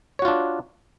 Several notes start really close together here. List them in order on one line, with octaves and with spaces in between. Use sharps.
C#5 F#4 F4 D4